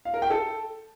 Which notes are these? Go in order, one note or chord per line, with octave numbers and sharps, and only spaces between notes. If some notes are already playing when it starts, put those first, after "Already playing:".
F5
A#4
G5
A4